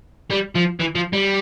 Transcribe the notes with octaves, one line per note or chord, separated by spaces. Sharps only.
G3
F3
E3
F3
G3